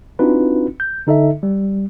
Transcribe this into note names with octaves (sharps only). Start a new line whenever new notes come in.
C4 D4 D#4 F4 F#4 B4
G6
D3 D#4 A4 D#5 E5
G3